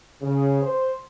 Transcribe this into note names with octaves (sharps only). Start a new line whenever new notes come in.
C#3
C5